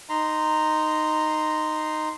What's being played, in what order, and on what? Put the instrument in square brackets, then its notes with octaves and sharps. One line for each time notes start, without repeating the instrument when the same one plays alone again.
[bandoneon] D#4 A#5 C6